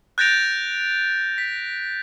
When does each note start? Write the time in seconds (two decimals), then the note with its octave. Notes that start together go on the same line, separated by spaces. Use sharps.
0.18 F#6 G6 A6 A#6 D7 F7
1.38 B6